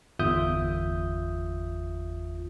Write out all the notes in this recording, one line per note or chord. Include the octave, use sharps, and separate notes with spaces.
G1 E2 F4 E5 D#6 G6